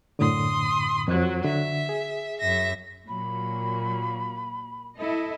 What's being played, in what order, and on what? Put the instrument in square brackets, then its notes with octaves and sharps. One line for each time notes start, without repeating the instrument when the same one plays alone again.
[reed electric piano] F#2 A2 D3 [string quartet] C6 D#6
[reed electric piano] F2 C5 [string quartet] F#3
[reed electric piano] D3 [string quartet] E5
[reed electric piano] G#4
[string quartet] F#2 E5 A#6
[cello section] A#2 F#3 A#3 [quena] B5
[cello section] E4 A4 D#5